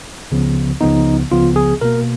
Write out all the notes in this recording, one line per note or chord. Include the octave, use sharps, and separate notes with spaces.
C#2 C#3 F3 B3
C#2 C#3 F3 B3 D#4
C#2 C#3 F3 B3 F4
G#4
B2 A#3 A#4